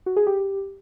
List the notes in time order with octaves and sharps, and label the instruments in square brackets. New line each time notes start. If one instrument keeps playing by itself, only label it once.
[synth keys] F#4
G#4
G4